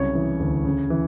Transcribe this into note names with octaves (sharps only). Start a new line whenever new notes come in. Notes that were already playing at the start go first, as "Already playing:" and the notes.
Already playing: C2 C#3 F#3 C#5
E3
D2
C#3
E3